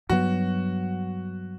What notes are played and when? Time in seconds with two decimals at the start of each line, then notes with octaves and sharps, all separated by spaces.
0.10 G2 F#3 B3 F#4